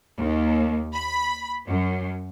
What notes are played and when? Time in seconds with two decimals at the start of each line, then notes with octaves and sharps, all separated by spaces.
0.19 D#2
0.95 B5
1.67 F#2